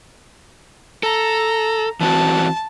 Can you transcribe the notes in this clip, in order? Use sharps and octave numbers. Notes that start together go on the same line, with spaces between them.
A4 A#5
E3 C4 F#4 A5